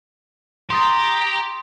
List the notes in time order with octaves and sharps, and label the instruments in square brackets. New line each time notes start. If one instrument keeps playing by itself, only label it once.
[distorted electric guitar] G4 [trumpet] A#5 [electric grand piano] C6 D#6 A6